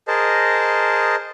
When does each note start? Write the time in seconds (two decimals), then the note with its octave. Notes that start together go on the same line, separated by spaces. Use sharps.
0.08 G#4 A#4 C5 D#5 A5